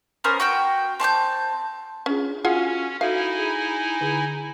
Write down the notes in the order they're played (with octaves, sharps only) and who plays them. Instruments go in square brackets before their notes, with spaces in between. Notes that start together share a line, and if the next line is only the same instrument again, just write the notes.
[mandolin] B3 C#4 A#4 C5
F#4 G5 G6
C4 A5 C#6 G6
[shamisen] C#4 [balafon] D4 F4 G#4
[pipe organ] C#4 [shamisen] F4 G#4 F#5 [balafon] F#4
[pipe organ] D#4 E4 G#5 [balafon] F#4 A4 E5 [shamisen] F5
[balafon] G#4
D3 G#4